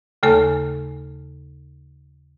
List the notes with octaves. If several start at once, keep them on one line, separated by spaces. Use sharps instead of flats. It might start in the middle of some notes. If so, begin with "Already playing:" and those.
D#2 C#3 A3 A4 G#5